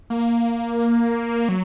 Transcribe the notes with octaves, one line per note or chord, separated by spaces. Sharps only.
A#3
F#3